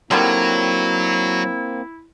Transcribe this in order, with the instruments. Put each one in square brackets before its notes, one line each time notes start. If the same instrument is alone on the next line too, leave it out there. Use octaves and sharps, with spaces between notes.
[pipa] D3 D#3 G3 [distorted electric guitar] F#3 [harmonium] A#3 C4 [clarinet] E4